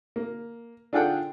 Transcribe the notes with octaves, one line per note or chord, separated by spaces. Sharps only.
A#3
D4 F4 G#4 A4 F#5 G5